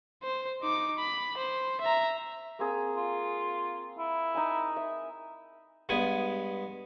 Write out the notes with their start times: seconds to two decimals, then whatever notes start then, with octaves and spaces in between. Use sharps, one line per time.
0.23 C5
0.62 D#4 D6
0.99 B5
1.37 C5
1.81 E5 A#5
2.59 A#3 C4 G#4
2.96 F4
3.98 E4
4.35 D#4 G#5
4.76 E5
5.89 G2 G#3 B3 G#5